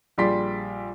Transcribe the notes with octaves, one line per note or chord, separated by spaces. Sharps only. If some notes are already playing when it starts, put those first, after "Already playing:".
A#1 G3 G#4 D5 C6 B6